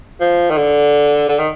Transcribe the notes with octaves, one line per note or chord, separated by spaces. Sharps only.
F3
D#3
D3
D3
D#3